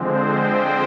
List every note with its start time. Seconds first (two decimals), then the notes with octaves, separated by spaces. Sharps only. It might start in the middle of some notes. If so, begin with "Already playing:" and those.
Already playing: D3 F3 G#3 C4
0.13 C5
0.41 G5